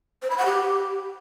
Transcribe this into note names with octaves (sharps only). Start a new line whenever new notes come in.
C5
B5
F#5
G4